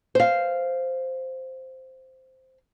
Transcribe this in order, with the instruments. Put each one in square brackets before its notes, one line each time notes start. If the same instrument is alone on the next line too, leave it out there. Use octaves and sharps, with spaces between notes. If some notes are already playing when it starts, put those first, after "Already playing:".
[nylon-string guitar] C5 F5